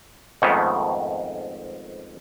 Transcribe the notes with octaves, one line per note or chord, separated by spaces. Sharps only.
F2 G#2 D#3 A3 B3 C#4